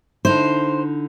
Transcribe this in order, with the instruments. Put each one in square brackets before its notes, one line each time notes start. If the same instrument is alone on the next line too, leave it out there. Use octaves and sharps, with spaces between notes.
[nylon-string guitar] D3 D#4 E4 [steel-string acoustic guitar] C5